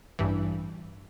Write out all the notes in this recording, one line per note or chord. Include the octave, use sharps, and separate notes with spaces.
A1 G2 E3